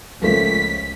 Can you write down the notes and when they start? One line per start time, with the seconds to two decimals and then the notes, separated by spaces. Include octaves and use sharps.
0.22 C#2 F3 A3 A#3 B6